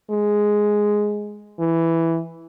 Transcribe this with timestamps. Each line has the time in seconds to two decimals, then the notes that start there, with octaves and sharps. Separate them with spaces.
0.10 G#3
1.60 E3